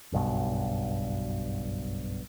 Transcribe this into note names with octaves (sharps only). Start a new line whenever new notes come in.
F#1 B1 G2 B2